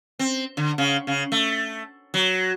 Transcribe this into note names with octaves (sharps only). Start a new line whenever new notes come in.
C4
D3
C#3
C#3
A3
F#3